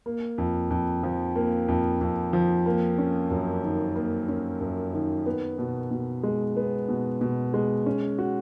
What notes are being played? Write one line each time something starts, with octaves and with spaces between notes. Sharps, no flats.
A#3
F2
F2
F3
A#3
F2
F2
F3
A#3
C#4
F#2
D#3
A#3
C#4
F#2
D#3
B3
B2
B2
G#3
B3
B2
B2
G#3
C#4
F#4